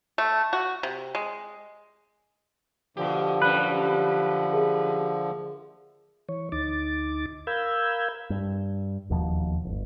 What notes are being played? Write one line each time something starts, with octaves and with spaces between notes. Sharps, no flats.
A3
F#4
C3
G#3
B2 D3 F3 G4
F#2 A2 G3 B4
G#4 A#4 E5
E3 C#5
D2 D#4 D6 A6
A#4 F5 B5 E6 G6 G#6
G2
E1 D#2 B2 F3
D1 G1